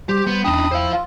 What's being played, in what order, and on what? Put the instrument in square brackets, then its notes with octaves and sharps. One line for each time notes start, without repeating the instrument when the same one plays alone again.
[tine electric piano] G3 [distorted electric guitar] G4 [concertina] C5
[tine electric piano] G3 [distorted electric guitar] B3
[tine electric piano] E2 G5 [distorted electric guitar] D4 D#4 [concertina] B5 D#6
[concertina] E4 [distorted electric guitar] C5 F5
[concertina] F4 [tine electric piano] F5